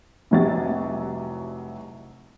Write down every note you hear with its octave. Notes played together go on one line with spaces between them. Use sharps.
F1 C2 F#3 G4 A6